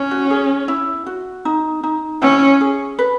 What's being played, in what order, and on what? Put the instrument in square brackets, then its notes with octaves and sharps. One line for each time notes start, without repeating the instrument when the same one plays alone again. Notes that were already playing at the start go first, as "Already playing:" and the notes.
Already playing: [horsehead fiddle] C#4
[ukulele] F#4
G#4
E4
F#4
D#4
D#4
[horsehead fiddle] C#4 [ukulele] E4
[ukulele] G#4
B4